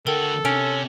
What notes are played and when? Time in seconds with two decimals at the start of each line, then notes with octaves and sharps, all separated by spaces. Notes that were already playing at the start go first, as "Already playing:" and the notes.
0.07 D3 F#4 A4 A#4 G5
0.45 C3 C#4 D7 F7